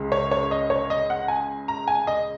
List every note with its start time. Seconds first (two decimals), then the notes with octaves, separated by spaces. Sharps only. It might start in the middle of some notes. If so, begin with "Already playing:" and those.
Already playing: C#2 C#3 G#3
0.12 C#5
0.31 C#5
0.51 D#5
0.70 C#5
0.90 D#5
1.10 F#5
1.28 G#5
1.68 A#5
1.88 G#5
2.07 D#5